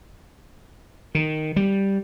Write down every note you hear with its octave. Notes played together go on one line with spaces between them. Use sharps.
D#3
G3